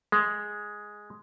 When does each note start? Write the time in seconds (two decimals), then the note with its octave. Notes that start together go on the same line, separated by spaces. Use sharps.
0.12 G#3